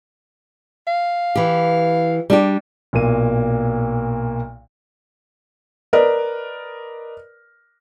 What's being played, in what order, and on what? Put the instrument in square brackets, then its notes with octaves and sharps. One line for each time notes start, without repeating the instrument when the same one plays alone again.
[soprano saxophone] F5
[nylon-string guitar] E3 G4
G3 D4 G4
[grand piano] B1 A#2 A#3 D#7
[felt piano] A#4 B4 D5 D#5